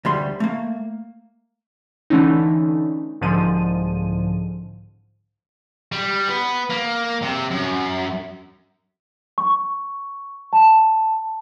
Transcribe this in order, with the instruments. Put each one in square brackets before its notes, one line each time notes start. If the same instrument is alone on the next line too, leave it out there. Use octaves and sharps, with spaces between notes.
[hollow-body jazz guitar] D2 G3 C6
A3 A#3
[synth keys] D3 E3 A3 C#4 D#4
C2 G#2 D3 F3 D#7
[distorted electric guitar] G3
B3
A#3
C3
F#2
[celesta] C#6
A5